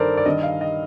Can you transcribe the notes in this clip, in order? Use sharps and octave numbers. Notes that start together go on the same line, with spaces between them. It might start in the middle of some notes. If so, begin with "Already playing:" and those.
Already playing: G2 D#3 A4 A#4 C5 D5
D5
G2 D#3 D#5
F5
D#5